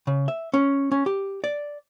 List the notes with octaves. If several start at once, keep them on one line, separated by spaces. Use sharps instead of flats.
C#3
E5
C#4
C#4
G4
D5